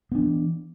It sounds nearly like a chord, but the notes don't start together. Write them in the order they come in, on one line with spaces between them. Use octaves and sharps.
B3 D4 E3